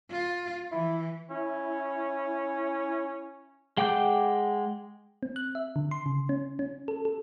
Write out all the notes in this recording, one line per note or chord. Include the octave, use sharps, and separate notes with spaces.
F4
E3 E4
C#4 E4
G#3 F#5 G5 D6 G6
C4
F#6
E5
D3
C6
C#3
C#4
C#4
A4
A4